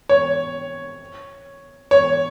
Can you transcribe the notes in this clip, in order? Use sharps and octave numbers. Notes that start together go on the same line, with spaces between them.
C#5
C#5